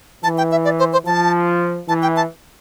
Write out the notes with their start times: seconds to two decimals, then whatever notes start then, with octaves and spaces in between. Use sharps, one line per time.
0.23 E3 A5
0.38 G5
0.52 E5
0.65 D5
0.79 C5
0.93 C5
1.06 F3 A5
1.88 E3 A5
2.02 G5
2.16 A5